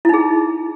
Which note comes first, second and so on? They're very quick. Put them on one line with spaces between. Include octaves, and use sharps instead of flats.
E4 D#4 G#4